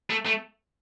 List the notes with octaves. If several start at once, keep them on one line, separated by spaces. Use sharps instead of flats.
A3
A3